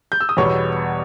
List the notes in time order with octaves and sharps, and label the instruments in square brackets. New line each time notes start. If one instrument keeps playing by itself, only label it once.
[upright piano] G6
E6
D#6
E2 B2 G3 B3 C#5 C#6